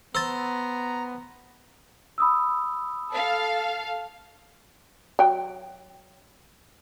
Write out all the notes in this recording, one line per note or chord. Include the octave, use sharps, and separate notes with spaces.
B3 C5 A#5 E6 A6
B5 D#6 E6
A4 F5
F#3 G5